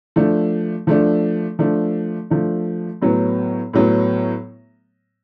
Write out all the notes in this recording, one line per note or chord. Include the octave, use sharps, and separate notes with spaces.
F3 A3 D4
F3 A3 D4
F3 A3 D4
F3 A3 D4
A2 F#3 B3
A2 F#3 B3